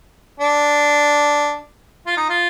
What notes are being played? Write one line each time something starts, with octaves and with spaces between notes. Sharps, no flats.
D4
F4
D#4
F4